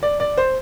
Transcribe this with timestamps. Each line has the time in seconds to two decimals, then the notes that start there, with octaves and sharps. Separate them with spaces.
0.03 D5
0.20 D5
0.38 C5